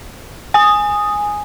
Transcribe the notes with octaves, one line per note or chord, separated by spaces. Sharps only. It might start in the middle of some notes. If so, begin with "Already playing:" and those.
G#5 D#6